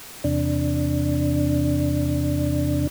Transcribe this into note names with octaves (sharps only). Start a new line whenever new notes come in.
E2 C3 D4